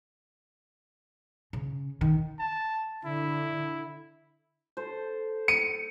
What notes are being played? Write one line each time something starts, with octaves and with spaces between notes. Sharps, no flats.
C#3
D#3
A5
D3 E4
A4 C5
C#7 D#7